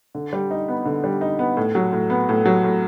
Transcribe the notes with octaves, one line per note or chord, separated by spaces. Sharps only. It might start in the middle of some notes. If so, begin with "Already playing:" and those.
D3
G3
D#4
B3
D3
G3
D#4
B3
A2
F#3
A2
B3
A2
F#3
A2